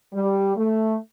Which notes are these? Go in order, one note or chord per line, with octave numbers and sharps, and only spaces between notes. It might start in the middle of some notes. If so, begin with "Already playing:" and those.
G3
A3